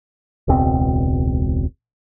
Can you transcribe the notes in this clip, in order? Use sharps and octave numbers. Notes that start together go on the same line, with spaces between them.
E1 C#2 B2 C4